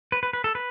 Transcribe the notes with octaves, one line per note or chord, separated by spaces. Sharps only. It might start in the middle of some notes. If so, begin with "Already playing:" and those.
B4
B4
B4
A4
B4